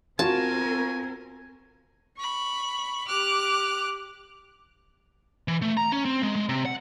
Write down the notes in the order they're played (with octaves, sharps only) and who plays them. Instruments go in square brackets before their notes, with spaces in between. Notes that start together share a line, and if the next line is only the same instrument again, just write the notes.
[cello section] C4 A#4 [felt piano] F4 F#4 [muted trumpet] G#5 [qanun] A5
[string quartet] B5 C#6
G4 D6 F6 F#6
[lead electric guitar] E3
A3
A#5
C#4
C4
G#3
G#3
C3
F#5